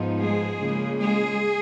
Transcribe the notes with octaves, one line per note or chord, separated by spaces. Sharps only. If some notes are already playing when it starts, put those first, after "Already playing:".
Already playing: G#2 F3 B3 D#4
G#3 G#4
C#3 F3 A#3
G#3 G#4